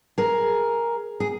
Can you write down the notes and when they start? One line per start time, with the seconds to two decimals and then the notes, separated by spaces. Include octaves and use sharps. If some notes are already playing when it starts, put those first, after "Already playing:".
0.18 G#4 A#4
1.20 G#4